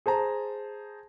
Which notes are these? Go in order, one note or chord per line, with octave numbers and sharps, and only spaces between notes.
G#4 C5 A5 A#5